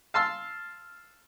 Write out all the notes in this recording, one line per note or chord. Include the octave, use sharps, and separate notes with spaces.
F5 A5 C6 E6